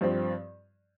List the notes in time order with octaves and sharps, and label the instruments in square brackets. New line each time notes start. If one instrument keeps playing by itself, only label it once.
[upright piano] G2 F3 C4